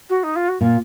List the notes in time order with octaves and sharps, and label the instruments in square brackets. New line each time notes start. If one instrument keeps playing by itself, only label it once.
[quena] F#4
D#4
F4
F#4
[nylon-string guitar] A#2 [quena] F4